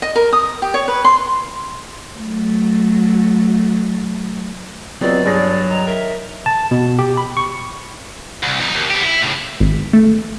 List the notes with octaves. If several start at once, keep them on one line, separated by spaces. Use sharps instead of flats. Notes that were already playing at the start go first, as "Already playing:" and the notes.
D#5
A#4
D#6
G4
C#5
B4
C6
F#3 A3
C#2 F#3 B3 C4 D5
G2 F#3 D4 G#4 A#6
D#3 A#5
A#4 E5
A5
B2
G4
B5
C#6
C2
E2 D#4
D#2
B3 G4
E4
A2 C#3
G#1
A3